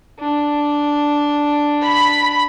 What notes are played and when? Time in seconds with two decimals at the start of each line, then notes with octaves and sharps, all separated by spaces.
0.20 D4
1.83 B5